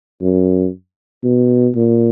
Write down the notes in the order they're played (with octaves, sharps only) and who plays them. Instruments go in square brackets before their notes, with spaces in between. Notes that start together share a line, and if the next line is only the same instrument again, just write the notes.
[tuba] F#2
B2
A#2